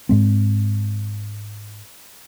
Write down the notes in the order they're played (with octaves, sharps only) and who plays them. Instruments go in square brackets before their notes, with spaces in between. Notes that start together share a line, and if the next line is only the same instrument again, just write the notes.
[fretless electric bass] G#2 G#3 C4